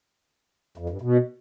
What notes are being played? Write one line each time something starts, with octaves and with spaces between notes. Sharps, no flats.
F2
G2
B2